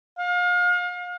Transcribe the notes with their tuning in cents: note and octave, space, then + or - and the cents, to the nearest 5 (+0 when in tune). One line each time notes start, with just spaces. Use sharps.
F5 +35